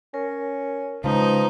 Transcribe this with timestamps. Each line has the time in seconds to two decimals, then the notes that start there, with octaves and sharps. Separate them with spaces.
0.14 C#4 A#4
1.04 C#3 F3 G#3 D#4 B4 A#5